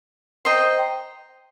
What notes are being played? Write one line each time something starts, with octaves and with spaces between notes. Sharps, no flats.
C5 D#5 G5 A#5